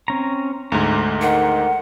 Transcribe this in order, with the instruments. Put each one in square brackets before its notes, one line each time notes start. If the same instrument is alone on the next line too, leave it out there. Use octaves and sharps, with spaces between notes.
[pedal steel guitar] C4 C#4 A#5
[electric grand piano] D2 G#2 [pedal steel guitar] A#5
[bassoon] D#3 [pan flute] F#5